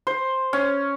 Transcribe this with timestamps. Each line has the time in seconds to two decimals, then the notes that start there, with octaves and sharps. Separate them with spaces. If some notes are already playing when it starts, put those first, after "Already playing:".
0.07 C5
0.53 C#4